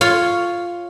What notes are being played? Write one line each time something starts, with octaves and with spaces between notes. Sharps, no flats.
F4 C#5